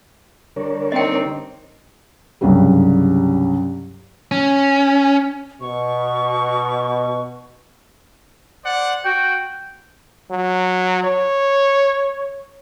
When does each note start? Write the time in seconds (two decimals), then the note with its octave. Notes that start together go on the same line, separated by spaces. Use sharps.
0.56 D3 G3 D4 A#4 C#5
0.92 C4 D#4 D#5 G5
2.41 C2 G2 C#3 F#3 G3
4.32 C#4
5.61 B2 C#6
8.65 C5 D5 F#5
9.04 F#4 G5
10.31 F#3
11.04 C#5